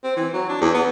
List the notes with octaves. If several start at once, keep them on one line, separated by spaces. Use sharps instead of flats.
C4
E3
F#3
D4
E2
B3